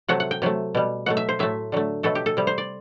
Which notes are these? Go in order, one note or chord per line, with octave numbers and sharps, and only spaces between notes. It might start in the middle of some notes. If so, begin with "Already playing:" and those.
C3 F#3 A3 F#5
F#5
G5
C3 F#3 A3
B2 G3
B2 F#3 A3 F#5
E5
C5
A2 F#3 A3 E5
D3 F#3 A3
B2 F#3 A3 A4
G4
A4
C3 G3
C5
D5